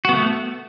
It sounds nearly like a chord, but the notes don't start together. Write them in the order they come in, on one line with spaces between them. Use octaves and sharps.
F#4 B3 A3